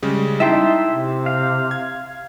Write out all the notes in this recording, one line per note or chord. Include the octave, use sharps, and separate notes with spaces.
C#3 G3 G#3
D#4 E4 E5 G5 A5 C6 B6
C3
F5
G#6